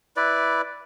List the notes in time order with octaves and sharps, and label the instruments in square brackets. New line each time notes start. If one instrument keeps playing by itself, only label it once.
[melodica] E4 B4 D5